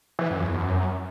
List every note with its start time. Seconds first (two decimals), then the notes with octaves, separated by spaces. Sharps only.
0.19 E3
0.30 F#2
0.42 E2
0.54 F#2